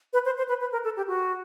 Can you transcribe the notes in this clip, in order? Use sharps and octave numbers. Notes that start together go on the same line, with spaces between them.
B4
C5
C5
B4
B4
A#4
A4
G4
F#4